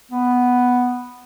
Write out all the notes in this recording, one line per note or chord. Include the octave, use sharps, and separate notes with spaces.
B3